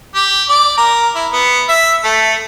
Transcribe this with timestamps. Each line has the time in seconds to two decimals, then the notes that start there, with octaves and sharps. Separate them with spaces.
0.15 G4
0.49 D5
0.78 A#4
1.15 E4
1.32 B3
1.68 E5
2.04 A3